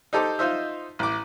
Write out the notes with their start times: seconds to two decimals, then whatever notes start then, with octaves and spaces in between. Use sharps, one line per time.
0.13 D#4 G4 A4 C5 D6
0.39 D#4 F4 C5 D#5 E5
0.99 A1 D6